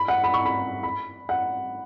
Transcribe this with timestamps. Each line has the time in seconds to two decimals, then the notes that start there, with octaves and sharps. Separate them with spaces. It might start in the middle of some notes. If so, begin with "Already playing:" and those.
Already playing: B5
0.08 F#5
0.24 B5
0.34 C#6
0.45 B5
0.83 B5
1.29 F#5